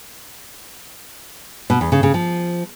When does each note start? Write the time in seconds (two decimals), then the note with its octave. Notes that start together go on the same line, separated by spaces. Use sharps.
1.70 B2
1.81 E2
1.92 C#3
2.03 C#3
2.14 F3